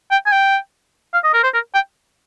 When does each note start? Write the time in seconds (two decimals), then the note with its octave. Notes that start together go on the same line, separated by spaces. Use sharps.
0.11 G5
0.26 G#5
0.32 G5
1.14 F5
1.24 D#5
1.34 A#4
1.44 C5
1.54 A#4
1.74 G5